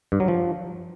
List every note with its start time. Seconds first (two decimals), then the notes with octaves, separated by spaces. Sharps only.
0.12 G2
0.20 F#3
0.28 F3